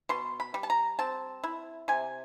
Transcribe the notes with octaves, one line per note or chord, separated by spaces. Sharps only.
B2 C6
B5
G3
A5
A#5
C4 A5
E4
C3 G#5